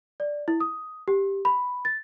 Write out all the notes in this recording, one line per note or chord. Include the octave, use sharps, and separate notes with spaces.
D5
E4
D#6
G4
B5
A6